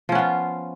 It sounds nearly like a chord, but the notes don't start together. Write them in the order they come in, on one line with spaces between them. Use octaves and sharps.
F3 C#4 B3 F4